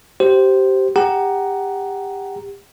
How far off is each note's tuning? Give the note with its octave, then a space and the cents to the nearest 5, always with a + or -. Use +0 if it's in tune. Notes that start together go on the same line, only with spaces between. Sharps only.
G4 -20 C5 +0
G4 +25 F#5 +20 A#5 +0